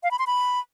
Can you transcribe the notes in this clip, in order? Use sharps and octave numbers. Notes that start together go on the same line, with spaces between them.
F5
B5
C6
B5